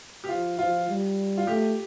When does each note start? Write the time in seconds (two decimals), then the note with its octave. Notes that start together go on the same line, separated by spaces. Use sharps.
0.24 G4
0.29 F3 F4
0.59 F3 F4
0.88 G3
1.38 F4
1.47 A3 G4